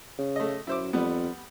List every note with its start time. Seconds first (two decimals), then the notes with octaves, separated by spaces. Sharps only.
0.19 C#3
0.36 A3 D#5
0.67 F#2 E4 C5 D6
0.93 F2 G3 B3